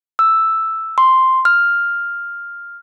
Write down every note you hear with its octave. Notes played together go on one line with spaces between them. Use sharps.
E6
C6
F6